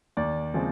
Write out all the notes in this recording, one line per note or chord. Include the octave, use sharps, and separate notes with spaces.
D#2 D5
C#3 F3 G#3 C4